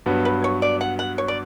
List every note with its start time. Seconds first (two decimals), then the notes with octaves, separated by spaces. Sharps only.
0.06 G2 F#3 B3
0.25 B4
0.44 C#5
0.62 D5
0.81 F#5
0.99 F#5
1.18 C#5
1.28 D5